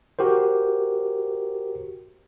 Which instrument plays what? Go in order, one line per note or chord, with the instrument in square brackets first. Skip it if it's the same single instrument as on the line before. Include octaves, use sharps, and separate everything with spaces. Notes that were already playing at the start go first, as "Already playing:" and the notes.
[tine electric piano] F#4 G4 A#4 C5